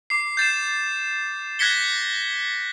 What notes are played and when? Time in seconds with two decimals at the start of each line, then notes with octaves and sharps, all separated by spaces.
0.10 D6 C7
0.37 G6 A6 C7 E7
1.59 F#6 G#6 A#6 B6 C#7 G7